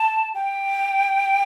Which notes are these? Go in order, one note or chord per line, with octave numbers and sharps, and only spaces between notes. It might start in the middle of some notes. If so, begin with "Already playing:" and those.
Already playing: A5
G5